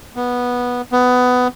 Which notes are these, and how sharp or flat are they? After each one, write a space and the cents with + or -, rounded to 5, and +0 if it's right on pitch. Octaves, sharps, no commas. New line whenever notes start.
B3 -10
B3 +15